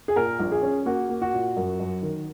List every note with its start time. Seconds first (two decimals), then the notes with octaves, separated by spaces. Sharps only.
0.08 G#4
0.16 A#2 A#4
0.39 A#1
0.52 G#4
0.63 C#4
0.86 A#3 F#4
1.09 A#3
1.22 F#4
1.33 A#2
1.56 F#2
1.80 F#2
2.02 D#3